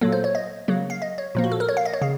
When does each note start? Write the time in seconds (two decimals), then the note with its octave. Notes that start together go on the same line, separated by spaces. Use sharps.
0.01 A#2 F#3 A#3 A4
0.12 C5
0.24 C#5
0.35 D#5
0.68 C#3 F#3 A#3
0.90 F5
1.02 D#5
1.18 C#5
1.35 A#2 F3 A#3
1.44 F#4
1.52 A4
1.60 A#4
1.69 C#5
1.77 F5
1.85 D#5
1.94 C#5
2.02 C#3 F5